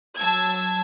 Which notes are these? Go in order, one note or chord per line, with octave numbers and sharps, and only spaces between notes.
F#3 A5 E6 G#6